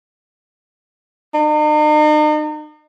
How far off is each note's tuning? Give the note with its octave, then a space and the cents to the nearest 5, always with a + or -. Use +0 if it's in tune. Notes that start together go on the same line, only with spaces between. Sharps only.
D#4 -45